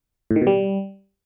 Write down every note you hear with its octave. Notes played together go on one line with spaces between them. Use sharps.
A2
D#3
B2
G3